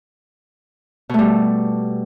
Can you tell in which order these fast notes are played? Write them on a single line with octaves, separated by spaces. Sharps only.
B2 A3 G3